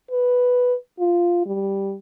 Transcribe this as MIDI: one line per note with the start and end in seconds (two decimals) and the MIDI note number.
0.11 0.74 71
0.99 1.41 65
1.46 1.94 55